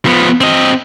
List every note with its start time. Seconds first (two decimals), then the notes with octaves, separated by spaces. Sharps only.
0.06 F3 B3
0.41 C4 D#5